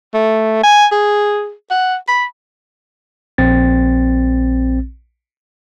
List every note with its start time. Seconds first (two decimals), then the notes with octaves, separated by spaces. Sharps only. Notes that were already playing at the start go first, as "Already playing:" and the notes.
0.14 A3
0.63 G#5
0.92 G#4
1.71 F#5
2.08 B5
3.38 A#1 C4 A6